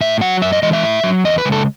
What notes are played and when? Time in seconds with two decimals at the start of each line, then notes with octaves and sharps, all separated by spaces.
0.01 A2 E5
0.21 F#3 F#5
0.42 F#2 E5
0.52 D#5
0.63 E3 G#3 D#5
0.73 E5
0.83 A2
1.04 F#3
1.24 E2 D#5
1.38 B4
1.45 C#3 G#3
1.52 A4